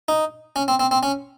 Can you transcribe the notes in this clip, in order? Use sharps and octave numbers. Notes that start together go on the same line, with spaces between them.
D#4
C#4
C4
C4
C4
C#4